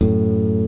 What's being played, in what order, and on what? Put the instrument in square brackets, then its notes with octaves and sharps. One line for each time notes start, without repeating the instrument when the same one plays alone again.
[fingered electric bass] F#2 A2